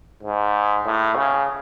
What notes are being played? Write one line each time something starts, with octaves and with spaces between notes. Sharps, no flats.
G#2
A2
C#3